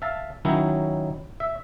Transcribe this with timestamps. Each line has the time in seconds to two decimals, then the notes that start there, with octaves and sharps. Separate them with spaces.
0.02 E5 F5 A5
0.45 D#3 F#3 C#4 D#4 E4
1.40 E5